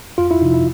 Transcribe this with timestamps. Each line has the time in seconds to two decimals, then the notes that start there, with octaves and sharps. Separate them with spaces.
0.18 F2 F4
0.31 E4
0.42 C3 F3 D#4
0.54 E4